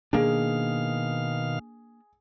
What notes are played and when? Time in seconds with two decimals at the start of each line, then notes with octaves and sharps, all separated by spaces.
0.13 B2 D#3 A#3 D4 G#4 F5